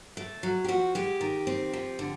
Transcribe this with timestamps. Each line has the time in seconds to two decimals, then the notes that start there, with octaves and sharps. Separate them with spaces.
0.17 A3
0.43 F#3
0.64 G4
0.68 F3 F#4
0.95 G#3 G4
1.21 D#3
1.47 C4
1.73 F3
1.99 D3